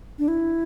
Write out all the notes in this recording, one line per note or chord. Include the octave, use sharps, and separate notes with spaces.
D4
E4